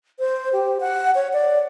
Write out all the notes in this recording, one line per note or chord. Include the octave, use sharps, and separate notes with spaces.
C5
G4
F#5
C#5
D5